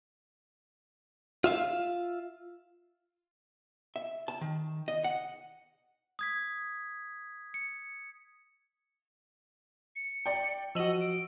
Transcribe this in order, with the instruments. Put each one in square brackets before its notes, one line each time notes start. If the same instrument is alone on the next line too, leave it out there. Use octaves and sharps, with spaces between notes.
[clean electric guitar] F4 E5 F5
[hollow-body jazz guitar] E5
A5
D#3
D#5
F#5
[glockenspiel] D#6 G#6 B6
C#7
[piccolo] C#7
[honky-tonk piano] D5 G5
[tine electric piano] F3 F#4 [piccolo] D#5 [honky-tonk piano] E6 D#7 F#7
[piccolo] D7